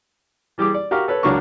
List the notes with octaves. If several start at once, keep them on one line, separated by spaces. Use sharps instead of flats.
E3 G3 G4 G#4 D6
D5
F#4 G4 A#4 F5
A4 B4 C#5
C#2 F#3 D4 A#4 C#6